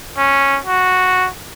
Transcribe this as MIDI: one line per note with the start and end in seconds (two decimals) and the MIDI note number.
0.18 0.59 61
0.65 1.29 66